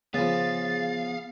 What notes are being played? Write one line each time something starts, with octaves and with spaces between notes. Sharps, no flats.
C#3 F3 B3 G#4 F5 A6